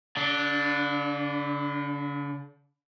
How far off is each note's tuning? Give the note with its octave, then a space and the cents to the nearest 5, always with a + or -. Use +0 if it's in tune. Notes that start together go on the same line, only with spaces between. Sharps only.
D3 -45 D4 +0